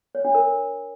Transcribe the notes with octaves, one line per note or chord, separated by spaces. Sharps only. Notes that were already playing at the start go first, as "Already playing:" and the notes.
C#5
D4
A#4